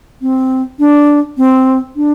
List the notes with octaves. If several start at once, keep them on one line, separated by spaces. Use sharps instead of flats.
C4
D4
C4
D4